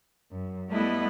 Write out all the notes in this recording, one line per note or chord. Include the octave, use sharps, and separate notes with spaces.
F#2
G3 A3 B3 E4 D#5